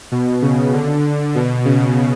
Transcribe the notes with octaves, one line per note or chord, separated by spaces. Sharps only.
B2
C#3
D3
B2
C#3